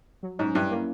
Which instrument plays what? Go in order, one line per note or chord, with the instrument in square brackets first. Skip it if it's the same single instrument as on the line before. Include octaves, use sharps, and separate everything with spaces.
[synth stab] F#3
[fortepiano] G#2 [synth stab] C#4
[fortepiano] G2 [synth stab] E4
[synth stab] A#3